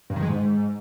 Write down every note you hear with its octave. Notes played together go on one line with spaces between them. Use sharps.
G2
D#3
G#3
G#2